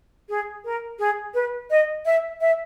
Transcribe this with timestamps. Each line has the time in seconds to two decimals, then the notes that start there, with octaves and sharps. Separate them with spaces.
0.29 G#4
0.65 A#4
0.99 G#4
1.34 B4
1.70 D#5
2.06 E5
2.41 E5